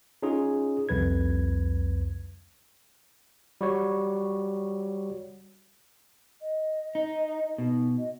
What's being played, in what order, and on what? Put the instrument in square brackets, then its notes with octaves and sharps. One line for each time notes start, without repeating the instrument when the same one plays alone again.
[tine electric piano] C#4 D#4 F4 G#4
C2 F2 B4 G#6
G3 F#4 C#5
[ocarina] D#5
[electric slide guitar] D#4
[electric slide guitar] B2 [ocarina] D#4
[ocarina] D#5